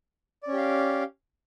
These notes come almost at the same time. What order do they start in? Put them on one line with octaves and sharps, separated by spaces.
D5 C#4 G4 F5